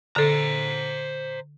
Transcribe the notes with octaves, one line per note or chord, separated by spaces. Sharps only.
D3 A4 C5 A#5